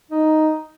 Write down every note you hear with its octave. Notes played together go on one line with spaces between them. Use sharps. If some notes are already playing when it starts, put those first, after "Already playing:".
D#4